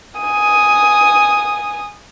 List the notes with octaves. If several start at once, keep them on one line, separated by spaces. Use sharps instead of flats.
G#5 D#6